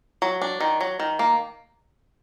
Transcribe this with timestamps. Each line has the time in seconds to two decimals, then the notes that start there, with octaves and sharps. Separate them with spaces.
0.22 F#3
0.41 D4
0.60 D#3
0.81 F#3
1.00 D#3
1.19 A#3